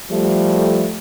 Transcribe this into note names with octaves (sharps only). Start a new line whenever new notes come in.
F3 G3 A3